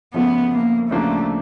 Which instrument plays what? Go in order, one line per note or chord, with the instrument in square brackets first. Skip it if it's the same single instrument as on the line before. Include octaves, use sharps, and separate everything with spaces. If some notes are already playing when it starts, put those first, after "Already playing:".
[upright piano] F2 C#3 F3 A3 [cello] B3
[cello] A#3
[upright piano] D2 C#3 F3 A#3 D4 [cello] A3